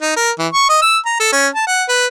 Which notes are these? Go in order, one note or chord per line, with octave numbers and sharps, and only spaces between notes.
D#4
A#4
E3
C#6
D#5
E6
A#5
A4
C#4
A5
F#5
B4